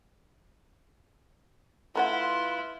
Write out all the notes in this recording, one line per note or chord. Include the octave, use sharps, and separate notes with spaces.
A3 E4 F4 A#4 B4 F#5 C6